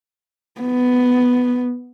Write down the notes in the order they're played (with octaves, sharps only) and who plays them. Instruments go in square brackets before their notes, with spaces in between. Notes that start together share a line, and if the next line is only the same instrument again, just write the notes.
[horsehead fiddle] B3